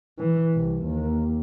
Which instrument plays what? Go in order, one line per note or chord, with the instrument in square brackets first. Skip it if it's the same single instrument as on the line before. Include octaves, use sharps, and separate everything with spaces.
[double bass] E3
C2
D#2